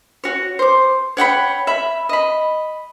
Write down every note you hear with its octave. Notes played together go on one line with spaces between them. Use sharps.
F#4 C#5
C5 D6
C#5 F#5 G5 B5
E5 B5
D#5 B5